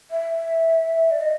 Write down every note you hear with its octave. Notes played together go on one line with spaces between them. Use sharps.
E5
D5
D#5